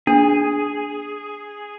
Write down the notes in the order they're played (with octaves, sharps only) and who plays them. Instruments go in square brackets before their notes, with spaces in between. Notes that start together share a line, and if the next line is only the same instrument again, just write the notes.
[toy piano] D4 [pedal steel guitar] G#4